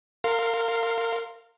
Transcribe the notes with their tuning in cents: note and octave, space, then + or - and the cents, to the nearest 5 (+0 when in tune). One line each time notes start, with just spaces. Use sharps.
A#4 -30 F5 +0 C6 +0